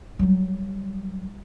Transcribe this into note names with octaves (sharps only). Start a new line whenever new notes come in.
F#3 G3